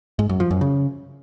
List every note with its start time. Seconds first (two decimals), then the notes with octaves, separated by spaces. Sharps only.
0.19 G#2
0.29 F#2
0.40 F3
0.51 F#2
0.61 C#3